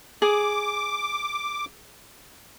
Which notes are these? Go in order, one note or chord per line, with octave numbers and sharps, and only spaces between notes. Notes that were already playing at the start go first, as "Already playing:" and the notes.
G#4 D6